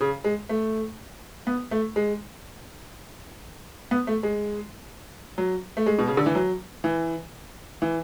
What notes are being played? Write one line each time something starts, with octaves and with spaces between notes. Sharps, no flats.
C#3
G#3
A3
B3
A3
G#3
B3
A3
G#3
F#3
A3
G#3
B2
C#3
D3
E3
F#3
E3
E3